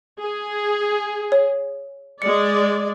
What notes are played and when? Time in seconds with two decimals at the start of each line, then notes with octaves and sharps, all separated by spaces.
0.20 G#4
1.32 C#5
2.22 G#3 D5 C#7